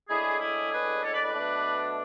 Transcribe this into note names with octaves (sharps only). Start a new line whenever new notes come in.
A2 G#3 D4 E4 G#4
E4 G#4
G#4 B4
A4 C#5
B4 D5
B4 D5
B2 A3 D4